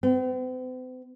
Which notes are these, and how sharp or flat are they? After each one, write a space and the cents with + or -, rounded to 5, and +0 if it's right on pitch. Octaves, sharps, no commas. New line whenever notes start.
C4 -45